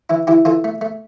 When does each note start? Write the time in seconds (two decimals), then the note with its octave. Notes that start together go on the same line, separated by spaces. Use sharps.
0.10 E3 E4
0.27 E3 E4 G4
0.45 E3 F4 A4
0.64 A3
0.81 A3